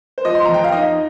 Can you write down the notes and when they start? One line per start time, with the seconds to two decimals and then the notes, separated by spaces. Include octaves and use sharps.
0.18 C5
0.25 F3 D#5
0.35 C6
0.45 F2 A#5
0.54 G5
0.64 F5
0.72 D#4 D#5